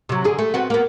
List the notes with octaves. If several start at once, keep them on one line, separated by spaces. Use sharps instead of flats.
C3 F#3
D3 G#4
A3
B3 C4 F#4
A#3 B3